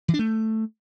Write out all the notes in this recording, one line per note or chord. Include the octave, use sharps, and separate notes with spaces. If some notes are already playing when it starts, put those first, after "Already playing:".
E3
D4
A3